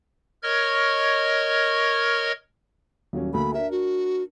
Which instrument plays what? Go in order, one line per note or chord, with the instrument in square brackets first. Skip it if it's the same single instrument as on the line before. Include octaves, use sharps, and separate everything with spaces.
[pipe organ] A#4 C#5 D#5 C#6 F6 G#6
[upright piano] D#1 F#3 C#4
[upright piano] D2 A#3 A4 [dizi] B5
[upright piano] D4 A#4 [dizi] E5
[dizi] F#4